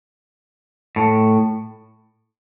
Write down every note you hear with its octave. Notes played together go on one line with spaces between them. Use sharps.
A2